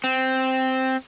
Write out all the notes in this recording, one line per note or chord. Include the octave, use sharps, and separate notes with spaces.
C4